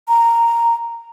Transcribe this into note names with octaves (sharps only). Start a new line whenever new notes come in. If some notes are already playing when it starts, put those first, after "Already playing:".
A#5